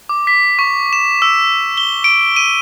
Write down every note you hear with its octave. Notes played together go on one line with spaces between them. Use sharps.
D6
B6
C#6
E7
E6
G7
D7
D#7